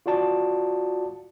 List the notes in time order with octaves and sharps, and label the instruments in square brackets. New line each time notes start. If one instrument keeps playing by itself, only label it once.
[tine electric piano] F4 F#4 D5 A5